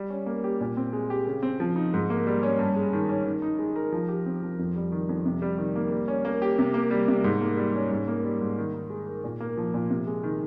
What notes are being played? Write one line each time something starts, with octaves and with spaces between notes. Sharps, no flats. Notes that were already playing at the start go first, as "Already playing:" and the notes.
Already playing: G3
C#4
A#3
G4
A#2
C4
G#3
G4
C#3
C4
F3
D#4
G#2
A#3
G3
C#4
G2
G#3
D#3
C#4
D#3
D#4
G#3
A#4
F3
G4
C4
F3
F2
G3
D#3
F2
C3
G3
D#3
A#3
G3
C#4
A#3
G4
C3
A#3
G3
C3
G#2
A#3
G3
C#4
G#2
A#3
G3
G#2
D#3
D#4
G#3
A#4
A#2
A#3
F3
A#2
C3
G#3
D#3